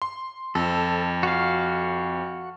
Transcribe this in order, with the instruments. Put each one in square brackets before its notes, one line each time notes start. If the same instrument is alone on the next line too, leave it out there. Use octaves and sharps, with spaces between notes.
[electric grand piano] C6
[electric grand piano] F2 [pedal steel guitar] A4
[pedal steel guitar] F#4 F5